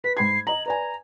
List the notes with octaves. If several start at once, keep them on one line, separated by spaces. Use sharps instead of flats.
B4 B6
G#2 B5 G#6 C7
D#5 A#5 F#7
B4 D5 G#5 A#5